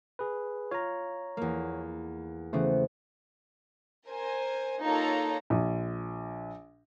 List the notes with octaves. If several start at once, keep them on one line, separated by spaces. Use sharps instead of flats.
G#4 B4
F4 C#5 A#5
E2 A#3
C#3 E3 A3 B3 C5
A#4 C5 G#5
A#3 D#4 F4 A4 C#5 A#5
A#1